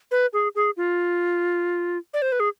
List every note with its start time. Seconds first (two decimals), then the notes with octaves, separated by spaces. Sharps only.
0.11 B4
0.33 G#4
0.55 G#4
0.77 F4
2.13 D5
2.22 C5
2.32 B4
2.40 G#4